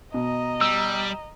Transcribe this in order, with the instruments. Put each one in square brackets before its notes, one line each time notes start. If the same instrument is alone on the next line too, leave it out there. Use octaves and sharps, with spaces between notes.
[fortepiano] B2 [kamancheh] D#5 A#5
[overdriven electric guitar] G3 [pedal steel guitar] E6